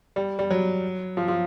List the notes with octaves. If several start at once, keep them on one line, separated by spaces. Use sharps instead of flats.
G3
G3
F#3
F3
F3